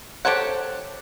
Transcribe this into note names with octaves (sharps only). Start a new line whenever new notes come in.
G4 A4 C5 C#5 F#5